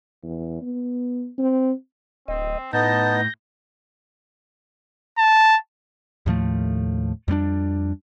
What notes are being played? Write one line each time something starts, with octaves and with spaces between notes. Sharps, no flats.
E2
B3
C4
D1 C4 D#5
A2 B3 D#4 A5 G6 A#6
A5
D#2 A2 F3 A3
F2 G3 B3 D4